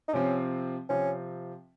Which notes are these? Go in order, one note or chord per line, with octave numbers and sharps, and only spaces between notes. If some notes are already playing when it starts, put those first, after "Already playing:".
D#4
C3 F3 C4 C#4
C3 F3 C4 C#4